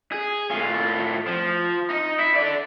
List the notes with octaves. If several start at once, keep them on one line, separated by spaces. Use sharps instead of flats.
G#4
A2 F4
F3
D#4
E4
A4 D5